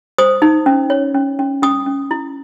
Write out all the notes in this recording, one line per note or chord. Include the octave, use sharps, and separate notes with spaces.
C5 D#6
D#4
C#4
C#5
C#4
C#4
C#4 D#6
C#4
E4